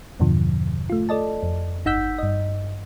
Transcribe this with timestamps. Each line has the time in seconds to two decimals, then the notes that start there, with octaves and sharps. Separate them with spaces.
0.20 E2 G2 B2 D3 F3
0.90 A3 F4
1.09 A4 D5 D#5 A5
1.43 F2
1.86 G1 D#4 F#5 E6 G6 B6
2.19 G2 D#5